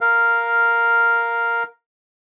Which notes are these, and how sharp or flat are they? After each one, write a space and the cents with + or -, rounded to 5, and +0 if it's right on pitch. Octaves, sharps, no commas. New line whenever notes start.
A#4 +0 F5 +0